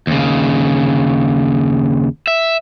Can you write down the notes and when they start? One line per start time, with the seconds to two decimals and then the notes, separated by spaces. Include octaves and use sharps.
0.07 D#2 C#3
2.27 E5